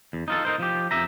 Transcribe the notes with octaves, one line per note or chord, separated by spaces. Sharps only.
E2
D#4 F4 A4
D#4 A#4 C5
F3 G4
F2 E5 A#5